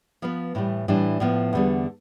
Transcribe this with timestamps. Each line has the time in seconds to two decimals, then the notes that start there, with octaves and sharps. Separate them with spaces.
0.22 F3 B3 F4 B4
0.55 A2 E3 G3
0.88 A2 E3 G3 D4
1.20 A2 F3 B3
1.53 E2 D3 G3 B3